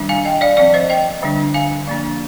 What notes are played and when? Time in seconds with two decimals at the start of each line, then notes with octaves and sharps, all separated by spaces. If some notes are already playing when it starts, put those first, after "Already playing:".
Already playing: D#3 G3 D4
0.09 F5 G#5
0.25 D#5 G5
0.41 D5 F5
0.57 F3 C4 D5 F5
0.74 C5 D#5
0.90 D#5 G5
1.22 D3 G3 D4
1.54 F5 G#5
1.87 F3 A#3 D4